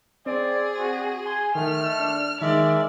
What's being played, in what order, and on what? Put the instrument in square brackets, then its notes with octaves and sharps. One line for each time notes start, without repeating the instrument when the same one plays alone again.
[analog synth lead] C4 [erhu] G#4 [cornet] D5
[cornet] F#4
[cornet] G#5 [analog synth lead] C6
[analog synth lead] D#3 [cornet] A3 [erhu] F6
[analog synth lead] D4
[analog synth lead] D#3 [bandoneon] G#3 A#4 E5 [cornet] A#3 [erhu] D5